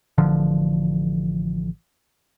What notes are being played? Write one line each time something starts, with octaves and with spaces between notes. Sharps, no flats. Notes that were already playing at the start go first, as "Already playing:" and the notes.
A1 D3 F3